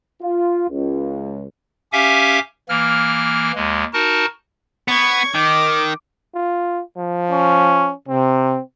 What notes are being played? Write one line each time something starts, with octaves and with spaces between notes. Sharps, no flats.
F4
C#2
C#4 G4 E5 F5 G#5 D6
E3 A#3 F6
D#2 G#3
D#4 F#4 A#4 A5
B3 C#6 G#6
D#3 D6
F4
F3
C#4
C3 C4